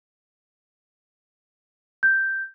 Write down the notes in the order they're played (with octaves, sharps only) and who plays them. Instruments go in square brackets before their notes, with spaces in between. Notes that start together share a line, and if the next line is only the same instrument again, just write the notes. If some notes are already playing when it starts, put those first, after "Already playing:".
[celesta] G6